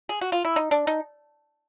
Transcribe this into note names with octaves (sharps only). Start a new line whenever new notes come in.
G#4
F#4
F4
E4
D#4
D4
D#4